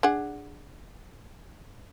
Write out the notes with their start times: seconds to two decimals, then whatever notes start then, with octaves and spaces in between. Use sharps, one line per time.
0.03 D4 G#4 F#5